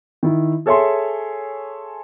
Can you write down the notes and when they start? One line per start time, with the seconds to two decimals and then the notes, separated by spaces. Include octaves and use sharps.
0.23 D#3 E4
0.66 G#4 A4 C#5 E5 G#5 C6